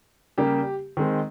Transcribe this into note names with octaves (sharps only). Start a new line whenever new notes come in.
C#3 G3 A#3 G4
D#3 G#3 C4